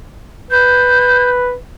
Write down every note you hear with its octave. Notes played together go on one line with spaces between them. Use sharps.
B4 G6